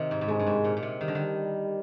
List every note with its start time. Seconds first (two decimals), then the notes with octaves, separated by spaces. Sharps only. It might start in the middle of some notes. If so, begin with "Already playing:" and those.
Already playing: C3 D#3
0.11 G#2
0.21 G#2
0.28 G2 G#3
0.39 G2
0.47 G#2
0.64 A#2
0.77 A#2
0.83 C3
1.01 D#3 G3
1.08 D3
1.15 D#3